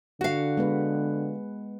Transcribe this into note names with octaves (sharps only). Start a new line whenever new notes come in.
D3 F#4 F5 F#5
G#3 B3 B4